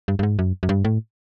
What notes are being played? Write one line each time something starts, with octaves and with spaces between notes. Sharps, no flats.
G2
G2
G#2
F#2
F#2
G2
A2